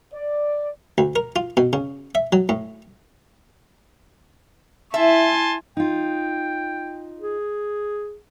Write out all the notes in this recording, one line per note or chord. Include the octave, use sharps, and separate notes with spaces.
D5
D2
A#4
F4
B2
C#3
E5
F#3
A2
E4 E5 G#5 A5 C6
D#4 F4 G5
G#4